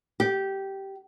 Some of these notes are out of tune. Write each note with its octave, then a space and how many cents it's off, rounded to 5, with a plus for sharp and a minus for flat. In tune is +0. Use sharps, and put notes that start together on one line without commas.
G4 -10